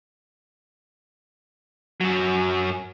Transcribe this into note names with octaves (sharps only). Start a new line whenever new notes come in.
F#2 F#3